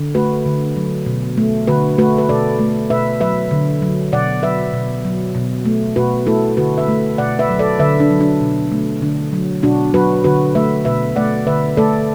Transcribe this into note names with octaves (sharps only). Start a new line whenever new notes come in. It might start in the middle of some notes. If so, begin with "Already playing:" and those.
Already playing: D3
A3 F#4 B4
D3
F#3
B2
A3
D3 F#4 B4
A3 F#4 B4
B4
B2 A4 D5
A3
B2 B4 E5
F#3 B4 E5
D3
F#3
B2 D5 F#5
F#3 B4 E5
B2
F#3
B2
A3
B2 F#4 B4
A3 E4 A4
D3 F#4 B4
B4 E5
A3
B2 D5 F#5
B4 E5
F#3
A4 D5
D3 B4 E5
D4
F#3
D4
B2
A3
D3 D4
F#3
B2 D4 F#4
F#3 F#4 B4
D3 F#4 B4
A3 B4 E5
B2 B4 E5
A3 D5 F#5
D3 B4 E5
A3 A4 D5